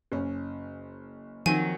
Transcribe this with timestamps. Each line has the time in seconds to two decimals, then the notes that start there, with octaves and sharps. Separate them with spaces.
0.12 F#1 C#4
1.46 D#3 F3 F#3 C4 G#5